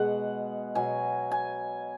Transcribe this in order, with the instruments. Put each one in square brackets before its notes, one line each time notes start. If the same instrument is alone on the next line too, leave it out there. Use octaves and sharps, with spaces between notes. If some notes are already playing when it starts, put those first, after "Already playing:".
Already playing: [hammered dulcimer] B2 G#3 F#5
B2 F#3 G#5
G#5